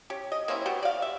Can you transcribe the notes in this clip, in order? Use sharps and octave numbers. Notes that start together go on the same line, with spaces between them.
C#4 G4
D#5
A#3 C4 C#4 E4
B3 F#4 G4
D5 F5
E5